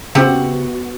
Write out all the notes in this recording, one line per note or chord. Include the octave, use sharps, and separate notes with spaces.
C#3 B3 C4 F#4 G4 E5 F#5